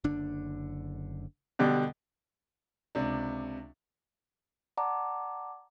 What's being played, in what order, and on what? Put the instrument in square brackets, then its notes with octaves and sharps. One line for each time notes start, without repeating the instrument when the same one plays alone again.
[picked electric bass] F#1 D3 D4
[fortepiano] B2 D3 G3
[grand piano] C#2 C3 D4
[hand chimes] D5 F#5 A5 A#5 D6